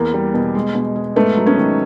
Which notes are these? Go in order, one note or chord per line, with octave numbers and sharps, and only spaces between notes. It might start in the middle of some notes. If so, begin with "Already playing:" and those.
Already playing: E2 A#3
G3
B2
G#3
B2
G#3
G#2 A3 B3
F#3
B3 C#4
D#3